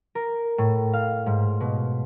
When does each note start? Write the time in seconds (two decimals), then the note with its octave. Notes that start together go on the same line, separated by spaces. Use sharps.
0.15 A#4
0.58 A2
0.93 F5
1.26 G#2
1.60 B2